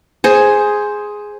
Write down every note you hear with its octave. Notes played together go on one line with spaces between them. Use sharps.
G#4 C5